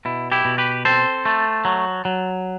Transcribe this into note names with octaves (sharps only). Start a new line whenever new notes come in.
B2 E4
E4 G4
B2
G4 B4
C4 A4 C5
A3
F#3
F#3